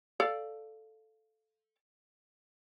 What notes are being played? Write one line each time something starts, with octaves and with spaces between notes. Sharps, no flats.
A4 D5 F5